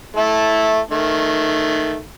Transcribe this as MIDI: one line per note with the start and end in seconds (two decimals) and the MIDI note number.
0.17 0.79 57
0.17 0.79 64
0.17 0.79 81
0.91 2.04 51
0.91 2.04 57